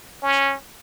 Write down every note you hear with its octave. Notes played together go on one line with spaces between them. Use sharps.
C#4